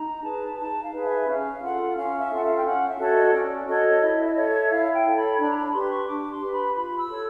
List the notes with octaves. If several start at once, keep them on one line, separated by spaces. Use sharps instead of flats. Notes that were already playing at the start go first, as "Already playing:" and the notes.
Already playing: D#4 A#5
G#4 B4 A5
D#4 A5
F5
G#4 B4
E5
C#4 F5
F4 A4 F#5
C#4 F5
E5
F4 A4 F#5
F5
G5
C#4 F#5
E5
F#4 A4 C#5
D#5
C#4 D5
F#4 A4 C#5 D#5
E4 D#5
D#5
A4 C#5
E5
E4 F5
G5
A4 C#5
B5
D4 B5
A#5
B5
G4 B4 C6
C#6
D4 D6
C6
G4 B4
B5
F4 B5
E6
A4 C#5